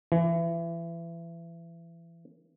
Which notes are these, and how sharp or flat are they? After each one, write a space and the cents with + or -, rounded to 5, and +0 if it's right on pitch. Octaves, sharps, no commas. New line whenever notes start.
E3 +30